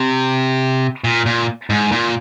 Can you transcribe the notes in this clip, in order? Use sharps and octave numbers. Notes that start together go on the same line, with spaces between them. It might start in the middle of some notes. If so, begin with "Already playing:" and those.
Already playing: C3
A#2
A#2
G#2
A#2